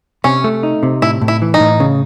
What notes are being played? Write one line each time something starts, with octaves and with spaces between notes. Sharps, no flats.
C3 C#4
A3
D#4
C3
A2 E4
A2
E4
E3
D#4
A2
C#3